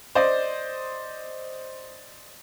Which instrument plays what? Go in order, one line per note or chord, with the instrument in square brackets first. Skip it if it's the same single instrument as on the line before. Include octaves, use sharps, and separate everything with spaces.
[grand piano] C5 D5 D#5